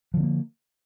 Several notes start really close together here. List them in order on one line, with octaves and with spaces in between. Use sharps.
F3 D3 C4 A#3